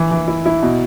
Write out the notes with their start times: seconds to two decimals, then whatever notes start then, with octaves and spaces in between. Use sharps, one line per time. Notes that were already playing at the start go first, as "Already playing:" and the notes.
Already playing: E3
0.11 E3
0.28 E4
0.46 E4
0.62 B2